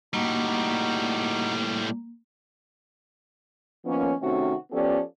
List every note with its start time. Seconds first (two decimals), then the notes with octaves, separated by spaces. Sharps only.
0.14 A2 G3 A#3 D#4 F#4
3.85 D#3 F3 A#3 B3 C#4
4.22 C3 D#3 A3 C4 C#4 F#4
4.72 F3 B3 C#4 G4 A4 D5